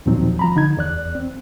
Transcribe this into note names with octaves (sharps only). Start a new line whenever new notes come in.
D#2 A#2 F3 F#3 C4 D#4
F3 A#5 B5
D3 D#4 G#6
E2 D5 F#6
C4